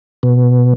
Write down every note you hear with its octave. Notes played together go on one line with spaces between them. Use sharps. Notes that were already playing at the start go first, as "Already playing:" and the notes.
B2